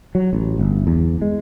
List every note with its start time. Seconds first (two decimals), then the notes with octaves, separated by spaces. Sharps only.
0.15 F#3
0.33 A1
0.59 G1
0.87 E2
1.22 G#3